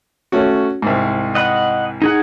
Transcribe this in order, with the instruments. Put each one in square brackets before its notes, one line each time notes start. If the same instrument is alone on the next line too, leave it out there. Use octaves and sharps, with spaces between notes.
[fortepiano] A3 C#4 F#4
C2 G#2
[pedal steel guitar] D#5 F#5 B5
D#4 G#4 F#5